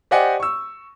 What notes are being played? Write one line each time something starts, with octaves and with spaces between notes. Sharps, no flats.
G4 C5 D5 D#5 F#5 G#5
C#6 E6